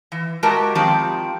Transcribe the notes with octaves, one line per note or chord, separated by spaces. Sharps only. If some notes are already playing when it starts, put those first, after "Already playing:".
E3
G#3 F#4 G4 A#4 A5 A#5
D#3 F3 C4 G4